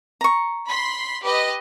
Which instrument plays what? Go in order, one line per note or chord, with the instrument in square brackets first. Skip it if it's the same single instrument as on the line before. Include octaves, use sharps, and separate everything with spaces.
[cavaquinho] A#5 C#6
[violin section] B5 C6 B6
G4 B4 D#5